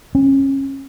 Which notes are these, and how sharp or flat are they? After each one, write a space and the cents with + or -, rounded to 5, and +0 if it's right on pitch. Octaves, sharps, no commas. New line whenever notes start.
C#4 -25